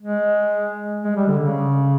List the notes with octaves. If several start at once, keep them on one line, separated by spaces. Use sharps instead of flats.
G#3
G#3
G3
D3
C#3